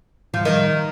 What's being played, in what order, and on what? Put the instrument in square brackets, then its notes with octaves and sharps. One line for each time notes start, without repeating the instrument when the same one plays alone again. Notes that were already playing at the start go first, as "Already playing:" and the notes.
[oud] F3
D#3